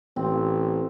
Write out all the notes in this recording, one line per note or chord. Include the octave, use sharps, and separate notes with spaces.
A1 C4